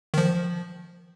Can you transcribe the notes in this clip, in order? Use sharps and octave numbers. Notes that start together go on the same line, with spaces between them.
D#3
F3